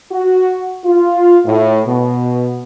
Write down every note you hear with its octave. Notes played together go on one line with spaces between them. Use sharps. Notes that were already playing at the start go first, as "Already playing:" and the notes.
F#4
F4
A2
B2